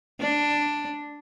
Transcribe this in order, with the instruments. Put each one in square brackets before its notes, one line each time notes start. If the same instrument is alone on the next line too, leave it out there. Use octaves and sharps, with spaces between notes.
[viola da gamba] D4